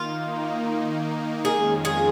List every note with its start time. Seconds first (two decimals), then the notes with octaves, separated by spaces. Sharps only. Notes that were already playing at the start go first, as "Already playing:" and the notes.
Already playing: D#3 A#3 D#4 F4
0.64 D#3 A#3 D#4
1.44 F2 D#3 G#3 C#4 F4 G#4
1.85 G#4